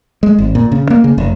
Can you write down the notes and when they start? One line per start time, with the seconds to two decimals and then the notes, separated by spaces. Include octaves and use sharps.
0.23 G#3
0.38 G#1
0.55 A#2
0.72 C#3
0.90 A#3
1.04 C#3
1.18 F1